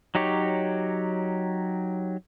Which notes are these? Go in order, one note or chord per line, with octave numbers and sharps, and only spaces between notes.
F#3 D#4 G4 C#5